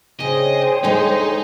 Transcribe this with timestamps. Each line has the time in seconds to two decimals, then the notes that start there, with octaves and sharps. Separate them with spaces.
0.20 C#3 D4 G#4 C5 C#5 D#5 G5
0.84 D#2 G#3 A3 D#4